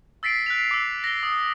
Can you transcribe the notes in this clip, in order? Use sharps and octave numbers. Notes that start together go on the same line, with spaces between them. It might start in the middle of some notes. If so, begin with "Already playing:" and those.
E6 A6 B6 C7 D7
F#6 B6 F7
D6 E6
A#6 G7
D#6